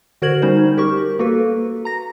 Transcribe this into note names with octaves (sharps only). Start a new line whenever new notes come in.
D3 F#4 A#4 C5 G#6 F#7
G3 C#4 D#4 C5
G4 A#4 C#6
A#3 F#4 A4 B4
A#5 A#6